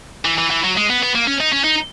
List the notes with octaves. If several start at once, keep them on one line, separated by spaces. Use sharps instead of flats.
E3
E3
E3
F#3
G#3
B3
B3
A#3
C#4
D#4
C#4
D#4